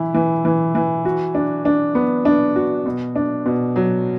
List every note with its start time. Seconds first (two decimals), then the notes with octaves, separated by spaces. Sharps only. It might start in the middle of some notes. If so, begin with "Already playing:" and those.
Already playing: E3 E4
0.14 E3
0.45 E3
0.75 E3
1.05 F#4
1.34 D4
1.65 D4
1.95 B3
2.25 D4
2.56 F#4
2.86 B2
3.15 D4
3.46 B2
3.76 F#3